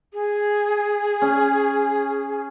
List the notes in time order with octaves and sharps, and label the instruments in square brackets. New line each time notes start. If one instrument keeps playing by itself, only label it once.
[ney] G#4
[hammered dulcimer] C#4